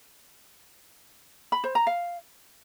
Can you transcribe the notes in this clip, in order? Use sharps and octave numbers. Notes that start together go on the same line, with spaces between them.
B5
C5
A#5
F5